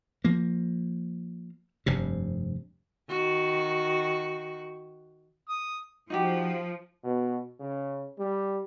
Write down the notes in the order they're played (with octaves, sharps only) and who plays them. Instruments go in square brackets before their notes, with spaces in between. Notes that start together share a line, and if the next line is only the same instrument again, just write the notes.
[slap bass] F3 A#3
F1 G2 C3
[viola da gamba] D#3 F#4
[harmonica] D#6
[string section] F3 [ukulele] D#4 F#4 G4
[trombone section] B2
C#3
G3